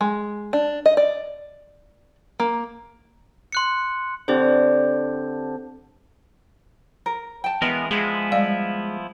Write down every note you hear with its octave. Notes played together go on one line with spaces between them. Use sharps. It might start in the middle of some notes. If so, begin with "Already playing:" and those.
G#3
D4
D#5
D5
A#3
C6 F#6 C#7
D3 C4 G4 C5
A#4
G5 A5
E3 G#3 B3 A#4
F3 G#3 B3 E4
G3 D5 F5